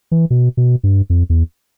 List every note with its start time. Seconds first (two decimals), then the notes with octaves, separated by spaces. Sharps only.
0.11 E3
0.30 B2
0.57 B2
0.83 G2
1.10 F2
1.30 E2